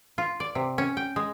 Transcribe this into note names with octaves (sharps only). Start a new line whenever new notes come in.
F4
D5
C3
C#4
G5
G#3